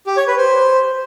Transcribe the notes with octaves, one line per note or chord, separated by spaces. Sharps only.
G4
C#5
B4
C5